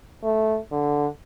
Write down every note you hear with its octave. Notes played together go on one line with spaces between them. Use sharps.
A3
D3